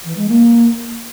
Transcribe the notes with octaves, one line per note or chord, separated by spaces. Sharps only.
E3
G#3
A#3